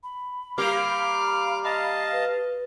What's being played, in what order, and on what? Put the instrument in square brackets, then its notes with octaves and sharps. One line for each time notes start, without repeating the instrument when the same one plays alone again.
[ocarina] B5
[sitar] G3 A#3 G4 [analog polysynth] F5 [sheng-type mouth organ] D6 F6
[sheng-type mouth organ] D#5 A5 [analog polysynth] F5
[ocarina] B4